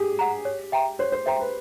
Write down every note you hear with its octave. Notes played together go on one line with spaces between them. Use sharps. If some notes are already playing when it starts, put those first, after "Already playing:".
Already playing: G4 G#4
F#5 A#5
C#5
E5 G5 A#5
C5 C#5
C5
C5 E5 G5 A#5
B4